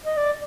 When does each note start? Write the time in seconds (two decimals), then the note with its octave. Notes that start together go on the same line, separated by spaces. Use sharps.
0.06 D#5
0.17 D5